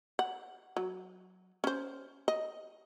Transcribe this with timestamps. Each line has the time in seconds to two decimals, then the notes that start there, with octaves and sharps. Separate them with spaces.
0.19 F#5
0.77 F#3
1.64 C#4 C5
2.28 D#5